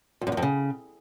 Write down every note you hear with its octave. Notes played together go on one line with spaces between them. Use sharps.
F2
F#2
E2
F2
C#3